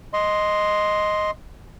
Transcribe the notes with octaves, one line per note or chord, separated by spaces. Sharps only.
D#5 C6